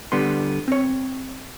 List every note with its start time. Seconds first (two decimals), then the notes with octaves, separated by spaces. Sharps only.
0.12 D3 G3 B3 C6
0.68 C4 C#5